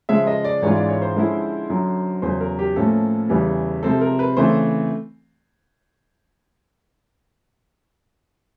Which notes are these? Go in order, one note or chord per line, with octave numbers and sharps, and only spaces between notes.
C#3 F3 G#3 E5
D#5
D5
G#2 E3 G#3 C#4 F4 C#5
D5
C#5
C5
D3 F3 G#3 C#4 E4
F#2 D3 F#3
E2 C#3 F#3 C5
A#4
G4
A2 F3 A#3 C#4 A4
E2 C#3 E3 G3
C3 F3 G#3 C4 A4
A#4
B4
C#3 E3 A3 C4 C5